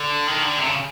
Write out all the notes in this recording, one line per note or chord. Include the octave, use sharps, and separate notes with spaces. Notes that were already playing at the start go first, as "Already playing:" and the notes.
Already playing: D3
D#3
D3
C3
C#3